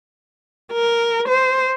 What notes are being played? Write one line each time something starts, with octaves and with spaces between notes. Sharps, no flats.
A#4
C5